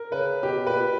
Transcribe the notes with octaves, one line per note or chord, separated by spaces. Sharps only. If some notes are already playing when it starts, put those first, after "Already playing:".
Already playing: A#4
C#3 B4
B2 G4
A#2 B4
B2
A#2